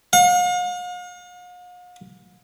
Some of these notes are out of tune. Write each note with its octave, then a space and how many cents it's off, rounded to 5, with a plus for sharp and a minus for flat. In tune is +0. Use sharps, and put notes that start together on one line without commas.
F5 +45